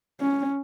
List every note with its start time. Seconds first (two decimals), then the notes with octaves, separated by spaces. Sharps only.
0.20 C#4